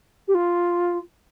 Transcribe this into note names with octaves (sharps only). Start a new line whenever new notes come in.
G4
F4